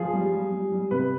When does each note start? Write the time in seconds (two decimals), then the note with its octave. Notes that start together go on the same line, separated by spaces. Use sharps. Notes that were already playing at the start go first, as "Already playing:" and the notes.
Already playing: F3 G#4
0.13 G3
0.32 G3
0.52 G3
0.72 G3
0.91 C3 B4